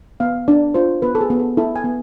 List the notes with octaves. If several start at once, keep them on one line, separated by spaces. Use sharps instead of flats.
B3 F5
D4 D5
F4 C5
B3 B4
A4
G#4
B3
A4
E4 A4
G#5
B3